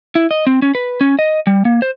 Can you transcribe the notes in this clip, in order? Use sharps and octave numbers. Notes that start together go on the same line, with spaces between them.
E4
D#5
C4
C#4
B4
C#4
D#5
G3
A#3
C5